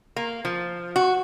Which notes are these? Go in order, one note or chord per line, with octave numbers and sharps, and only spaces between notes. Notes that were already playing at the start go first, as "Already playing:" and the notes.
A#3
F3
F#4